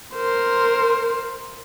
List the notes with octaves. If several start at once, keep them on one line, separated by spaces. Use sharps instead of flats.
A#4 C5